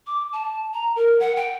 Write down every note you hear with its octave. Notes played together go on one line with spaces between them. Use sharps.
D6
A5
A#5
A#4
F#5
G5